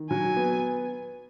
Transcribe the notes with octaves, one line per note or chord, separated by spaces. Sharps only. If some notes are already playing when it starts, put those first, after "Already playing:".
Already playing: D#3
F#3 G#5
B3